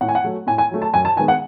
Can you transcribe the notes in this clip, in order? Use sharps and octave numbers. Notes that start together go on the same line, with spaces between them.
A2 F#5
G#5
F#5
F#3 A3
A2 G#5
G#5
F#3 A3
A5
F#2 G#5
A5
D#3 G#3 B3 G#5
F#5